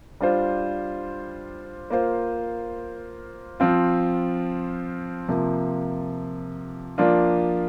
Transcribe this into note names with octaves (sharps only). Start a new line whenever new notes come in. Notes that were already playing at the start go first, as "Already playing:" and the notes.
G3 D4 F4 C5
A#3 F4 C5
F3 C4 F4
C3 F3 A#3
F3 A#3 D4 F4